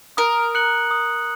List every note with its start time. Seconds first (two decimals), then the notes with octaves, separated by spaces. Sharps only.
0.17 A#4 D#6
0.55 F#6 C#7 F#7
0.91 D#6